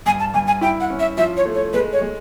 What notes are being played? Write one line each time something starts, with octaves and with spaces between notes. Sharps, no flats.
G2 G#5
A5
G2 G#5
G#5
E4 G5
F#5
C#4
E5
F3 E5
C#5
A3
C#5
G#3 B4
C#5
G#3